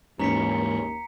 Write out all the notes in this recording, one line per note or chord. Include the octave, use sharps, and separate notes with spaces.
D#2 G#2 E3 A#3 C#4 A#5 B6 C#7